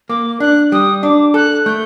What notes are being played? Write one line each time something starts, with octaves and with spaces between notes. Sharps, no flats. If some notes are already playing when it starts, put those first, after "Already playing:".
A#3 D6
D4 F#6
G3 D#6
D4 D6
A4 F#6
A3 G6